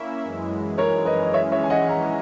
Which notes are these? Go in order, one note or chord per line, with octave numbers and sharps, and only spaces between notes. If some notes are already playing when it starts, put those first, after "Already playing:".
Already playing: A#3 C#4 E4 E5
F#2 E3 G#3
A#4 C#5
B4 D#5
D#5
E3 G#3 C#4 C#5 E5
C#5 E5
G#5
D#5 F#5
F#5 A#5